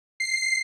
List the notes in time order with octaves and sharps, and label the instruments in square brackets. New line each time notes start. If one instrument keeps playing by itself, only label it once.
[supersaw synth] C7